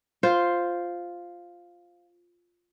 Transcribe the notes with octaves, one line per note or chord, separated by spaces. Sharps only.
F4 C5